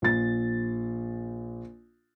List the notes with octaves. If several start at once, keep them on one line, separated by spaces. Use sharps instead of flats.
A#1 A6